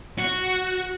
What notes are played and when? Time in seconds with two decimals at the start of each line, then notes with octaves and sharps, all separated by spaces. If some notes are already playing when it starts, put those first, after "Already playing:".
0.18 F#4